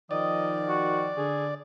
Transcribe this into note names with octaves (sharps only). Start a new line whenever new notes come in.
D#3 F3 D5 D#5
F#4
D3 G#4